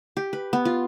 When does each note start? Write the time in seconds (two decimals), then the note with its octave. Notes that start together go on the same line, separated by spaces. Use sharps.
0.17 G4
0.33 B4
0.53 B3
0.65 F4